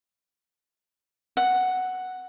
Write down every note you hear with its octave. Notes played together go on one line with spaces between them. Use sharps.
F#5